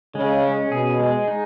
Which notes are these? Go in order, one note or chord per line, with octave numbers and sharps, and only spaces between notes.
C#3 G#3
C#4
B2 G#4
G#3
D#4